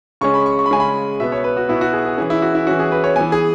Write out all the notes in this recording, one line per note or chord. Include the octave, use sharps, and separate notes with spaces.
C#3 G#3 C#4 C#6
B5
C#6
C#6
B5
C#3 G#3 C#4 G#5
B5
B2 B3 E5
C#5
B4
F#4
B2 B3 E4
F#4
G#4
G#4
E3 C#4 G#4
E4
F#4
E4
E3 C#4 F#4
G#4
B4
C#5
E3 B3 G#5
G#4